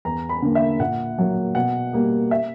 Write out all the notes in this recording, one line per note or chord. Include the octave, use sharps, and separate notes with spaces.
E2 A#5
B5
D3 A#3
E5
A#2 F#5
F#3 A#3
B2 F#5
G3 A#3
E5